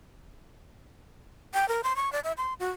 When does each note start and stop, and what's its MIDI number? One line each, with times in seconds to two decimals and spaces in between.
1.54 1.68 79
1.68 1.81 70
1.83 1.96 84
1.96 2.12 85
2.12 2.20 74
2.24 2.32 76
2.37 2.53 84
2.60 2.70 66